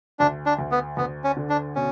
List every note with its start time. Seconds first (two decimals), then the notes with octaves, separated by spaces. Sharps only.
0.19 D2 D4
0.46 D4
0.59 D2
0.71 B3
0.97 D2 B3
1.24 C#4
1.36 D3
1.49 D4
1.75 B2 C#4